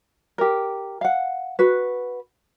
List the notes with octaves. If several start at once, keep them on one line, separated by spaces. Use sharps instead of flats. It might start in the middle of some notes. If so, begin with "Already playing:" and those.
G4 A#4
F5 F#5
F#4 B4